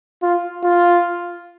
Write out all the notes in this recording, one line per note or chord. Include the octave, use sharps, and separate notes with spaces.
F4
F4